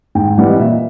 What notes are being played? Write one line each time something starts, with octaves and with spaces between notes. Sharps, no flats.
G#2 G5
E3 G3 C4 F#5
D#5
A#2 E5